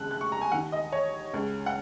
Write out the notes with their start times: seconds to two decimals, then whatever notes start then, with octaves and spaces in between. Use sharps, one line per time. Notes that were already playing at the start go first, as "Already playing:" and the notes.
Already playing: D#2 C#3 F#6
0.11 F#6
0.21 C#6
0.32 A#5
0.41 G#5
0.52 D#2 D#3 F#5
0.72 D#5
0.92 C#5
1.33 C#2 C#3
1.66 F#5